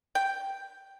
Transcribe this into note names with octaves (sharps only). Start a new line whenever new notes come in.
G5